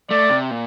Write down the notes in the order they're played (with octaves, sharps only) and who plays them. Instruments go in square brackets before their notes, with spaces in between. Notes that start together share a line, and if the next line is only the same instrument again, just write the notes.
[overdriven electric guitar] A3 [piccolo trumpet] D5
[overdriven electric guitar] C3
A#2